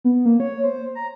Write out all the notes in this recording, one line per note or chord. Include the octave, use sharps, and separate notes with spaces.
B3
A#3
C#5
C5
A#5